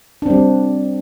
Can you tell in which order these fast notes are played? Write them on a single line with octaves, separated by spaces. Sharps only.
D4 C4 G3